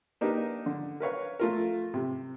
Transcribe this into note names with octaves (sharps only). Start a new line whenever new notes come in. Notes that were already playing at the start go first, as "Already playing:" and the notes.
A#3 D4 D#4 G4 A#4 B4
D3
A#4 B4 C#5 F5
A3 F4 A#4
C3